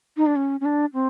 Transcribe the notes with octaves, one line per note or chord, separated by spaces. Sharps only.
D#4
D4
C#4
C#4
D4
C4